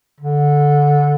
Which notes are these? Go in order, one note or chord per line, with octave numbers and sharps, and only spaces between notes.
D3